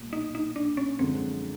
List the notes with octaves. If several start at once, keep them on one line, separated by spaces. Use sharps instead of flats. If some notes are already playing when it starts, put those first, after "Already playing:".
Already playing: B1 A#2 G3
D#4
D#4
D4
C#4
F#2 D3 F3 G#3 C4